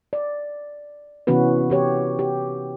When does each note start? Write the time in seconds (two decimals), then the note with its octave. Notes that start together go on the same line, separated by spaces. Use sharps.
0.13 D5
1.27 C3 E3 B3 C#4 F#4 B4
1.70 E3 G4 C#5
2.19 G4